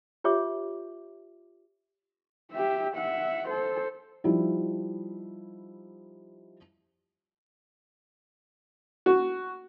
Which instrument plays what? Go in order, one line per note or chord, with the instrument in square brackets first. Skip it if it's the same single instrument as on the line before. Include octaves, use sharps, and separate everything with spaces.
[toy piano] F4 G4 C#5 E5 D6
[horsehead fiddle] G4 E5
E5 F#5
A4 C5
[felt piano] F3 G3 D#4 E4
[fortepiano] F#4